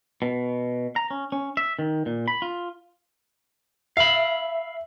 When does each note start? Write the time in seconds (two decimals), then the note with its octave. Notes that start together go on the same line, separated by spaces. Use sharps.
0.22 B2
0.96 A#5
1.11 C#4
1.32 C#4
1.57 E5
1.79 D#3
2.06 A#2
2.28 B5
2.42 F4
3.97 E5 F5 B5